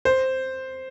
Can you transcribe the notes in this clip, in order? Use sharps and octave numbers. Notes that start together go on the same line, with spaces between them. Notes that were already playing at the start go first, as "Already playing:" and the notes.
C5